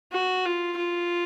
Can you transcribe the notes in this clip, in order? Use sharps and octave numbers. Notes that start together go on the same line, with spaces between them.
F#4
F4
F4